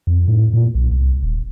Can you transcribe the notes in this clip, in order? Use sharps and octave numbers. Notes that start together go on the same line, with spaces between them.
F2
A2
A#2
B1
C2
D#1